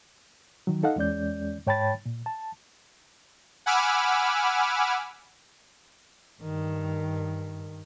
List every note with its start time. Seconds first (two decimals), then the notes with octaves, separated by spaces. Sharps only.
0.67 D#3 F#3
0.83 D#4 A4 D#5 F5 F#5
0.96 E2 G#3 C#4 D5 G6
1.67 G#2 C#5 G5 A5 B5 A6
2.06 A#2
2.26 A5
3.66 F#5 G#5 B5 D6 E6 F6
6.40 G2 D#3